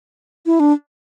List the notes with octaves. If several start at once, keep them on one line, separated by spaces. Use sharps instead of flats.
E4
D4